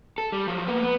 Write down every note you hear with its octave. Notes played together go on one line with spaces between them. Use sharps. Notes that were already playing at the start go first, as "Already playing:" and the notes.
A4
G3
F3 F#3
A#3 B3
B3